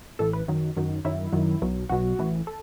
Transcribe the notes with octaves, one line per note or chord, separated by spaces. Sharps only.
A1 A2 E3 A4
B4
F#2 D#3 F#3
F#2 D#3 F#3
F#2 D#3 F#3 E4
F#2 D#3 F#3
B1 B2 F#3
B1 B2 F#3 F#4
A1 A2 E3
A4